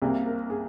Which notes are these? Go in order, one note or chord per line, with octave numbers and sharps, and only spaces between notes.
C2 C3 G3 A#3 G#4
A#4
G#4